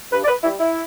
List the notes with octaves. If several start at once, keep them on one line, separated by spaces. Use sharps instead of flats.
G2 B4
D5
B4
G3 E4
E4